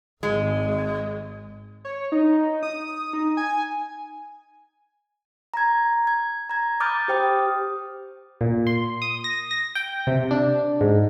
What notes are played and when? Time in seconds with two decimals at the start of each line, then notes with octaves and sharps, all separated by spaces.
0.23 G#1 G#3
1.85 C#5
2.12 D#4
2.63 D#6
3.13 D#4
3.37 G#5
5.54 A#5 G#6
6.07 G#6
6.49 A#5 G#6
6.80 B5 D6 D#6 F6 G6 A6
7.08 G4 C5 G5 D#6 F6
8.41 A#2
8.67 C6
9.02 D#6
9.24 A#6
9.51 A#6
9.75 G5
10.07 C3
10.31 D4
10.81 G#2